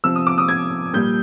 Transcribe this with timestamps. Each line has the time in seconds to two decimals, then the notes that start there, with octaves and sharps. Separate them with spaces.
0.04 C3 F3 E6
0.16 D#6
0.27 D6
0.38 D#6
0.48 G#6
0.93 A#2 G3 G6